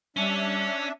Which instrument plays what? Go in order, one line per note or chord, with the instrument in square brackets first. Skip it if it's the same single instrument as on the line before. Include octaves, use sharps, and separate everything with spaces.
[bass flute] G3 [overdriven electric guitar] C#4 [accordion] D4 E5